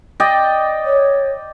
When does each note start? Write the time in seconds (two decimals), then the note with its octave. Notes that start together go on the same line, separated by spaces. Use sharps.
0.20 D5 D#5 G5
0.85 C#5